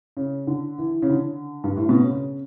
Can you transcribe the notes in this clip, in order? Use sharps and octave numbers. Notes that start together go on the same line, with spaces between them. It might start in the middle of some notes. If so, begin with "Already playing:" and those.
C#3
D3
E3
C#3
D3
G2
A2
B2
C#3